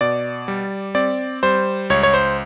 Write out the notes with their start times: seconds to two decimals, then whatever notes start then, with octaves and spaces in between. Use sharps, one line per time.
0.01 B2 D5
0.48 G3
0.95 C4 D5
1.43 G3 C5
1.90 C#2 C#5
2.03 C#5
2.14 C5